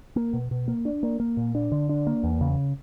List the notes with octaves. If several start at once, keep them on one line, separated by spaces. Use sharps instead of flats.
A#3
B2
B2
A#3
D4
A#3
A#3
A#2
D4
D3
D4
A#3
E2
C#3